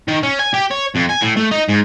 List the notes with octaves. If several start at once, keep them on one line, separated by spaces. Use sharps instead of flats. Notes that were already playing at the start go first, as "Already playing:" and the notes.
D#3
C#4
G#5
G4
C#5
F2
G#5
A2
A3
D#4
G#2